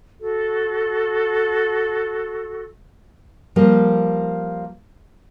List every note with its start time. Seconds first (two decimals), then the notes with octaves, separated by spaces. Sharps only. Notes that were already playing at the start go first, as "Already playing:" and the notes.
0.19 F#4 A4
3.56 F3 G3 A#3